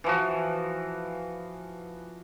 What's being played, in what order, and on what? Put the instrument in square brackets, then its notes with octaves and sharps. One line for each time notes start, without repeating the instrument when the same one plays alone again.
[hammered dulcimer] E3 F3 F#4